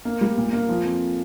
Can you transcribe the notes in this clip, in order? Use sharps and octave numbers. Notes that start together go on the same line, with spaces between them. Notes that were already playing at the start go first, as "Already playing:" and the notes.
A#3
G3
A#2
A#3
F3
F2